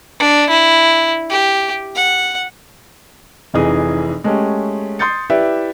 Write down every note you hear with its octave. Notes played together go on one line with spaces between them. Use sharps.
D4
E4
G4
F#5
F1 F2 E3 D#4 G#4 D#6
G#3 A3 C#4 G4
C6 D#6 G6 A6 C#7
E4 G4 B4 D5 E5